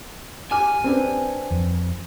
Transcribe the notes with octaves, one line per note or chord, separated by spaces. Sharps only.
G4 G#5 D6 F6
C4 D4 B4
F2